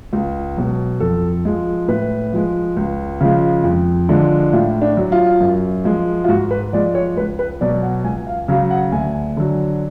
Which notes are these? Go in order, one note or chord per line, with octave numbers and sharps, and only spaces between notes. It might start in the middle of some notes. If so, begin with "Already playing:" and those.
C#2
B2 F#3
F2 A4
F3 G#3
A2 B4
F3 G#3
C#2
C#3 F3 G#3
F2
D3 F3 G#3
A2 F4
D4
F#3
F4
F#2
F3 G#3
F4
G#2 F#4
B4
F3 G#3 D5
C#5
C#2 B4
B4
B2 F#3 D5
F#5
C#2 G#5
F5
C#3 F#3 F5
F#5
D2 G#5
D3 F#3